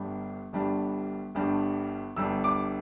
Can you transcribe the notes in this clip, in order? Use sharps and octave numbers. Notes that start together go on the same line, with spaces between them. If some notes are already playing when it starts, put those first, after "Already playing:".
Already playing: G1 G2 G3 D4
G1 G2 G3 D4
G1 G2 G3 D4
G1 G2 G3 D4 E6
D6